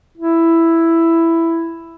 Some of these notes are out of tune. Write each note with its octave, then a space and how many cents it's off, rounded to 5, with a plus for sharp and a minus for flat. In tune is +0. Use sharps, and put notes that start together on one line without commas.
E4 +5